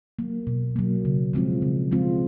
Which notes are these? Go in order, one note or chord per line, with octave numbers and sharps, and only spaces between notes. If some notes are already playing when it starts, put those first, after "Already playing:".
F#3 A#3
B2
F#3 A#3
C#3
F3 G#3 C4 F4
C#3
F3 G#3 C4 F4